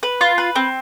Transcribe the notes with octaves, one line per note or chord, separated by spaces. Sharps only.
B4
F4
B4
C4